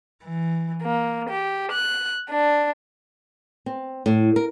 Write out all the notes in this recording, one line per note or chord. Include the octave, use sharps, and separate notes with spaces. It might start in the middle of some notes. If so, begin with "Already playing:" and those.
E3
A#3
G4
F#6
D4
C4
A2
A#4